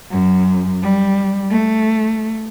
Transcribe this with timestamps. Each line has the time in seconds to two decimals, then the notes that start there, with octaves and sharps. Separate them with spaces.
0.11 F#2
0.83 G3
1.51 A3